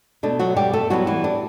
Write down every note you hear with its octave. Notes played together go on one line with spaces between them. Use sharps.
B2 A3 D4
F#3 F#4
G3 G4
A3 A4
A2 F#3 G3 B3 F#4
E3 E4
D4